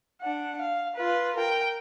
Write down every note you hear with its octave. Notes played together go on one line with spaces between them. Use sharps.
D4 F#5
F5
F4 B4
A#4 G5